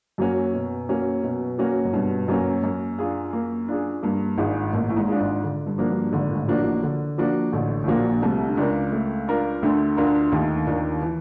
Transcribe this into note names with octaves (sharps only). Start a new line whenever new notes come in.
F#2 F#3 A#3 C#4 F#4
B2
F#3 A#3 C#4 F#4
B2
F#3 A#3 C#4 F#4
F#2
G2 B2
F#2 F#3 A#3 C#4 F#4
F#2 A#3
D4 F4 G#4
A#3
D4 F4 G#4
G2 A#3
G#1 G#2 D4 F4 G#4
A1 A2 A#3
A2
G#1 G#2
D4 F4 G#4
G#1 G#2
D3
G2
F3 A#3 D4 F#4
G2
G#1 G#2 D3
A#2
A1 A2
F3 A#3 D4 F#4
A1 A2
D3
F3 A#3 D4 F#4
A1 A2 D3
A2
A#1 A#2 F3 A#3 D4 F#4
C2 C3 A3
D3
C#2 C#3 D4 F4 A#4
A3
D4 F4 A#4
D2 D3 A3
D2 D3 D4 F4 A#4
D#2 D#3 A3
D#2 D#3 D4 F4 A#4
E3